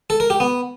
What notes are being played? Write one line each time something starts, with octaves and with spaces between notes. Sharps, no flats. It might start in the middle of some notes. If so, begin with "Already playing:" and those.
A4
A#4
G4
B3